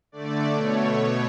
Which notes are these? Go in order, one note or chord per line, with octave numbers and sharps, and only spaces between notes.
D3 A3 D5
B2 A3 C#5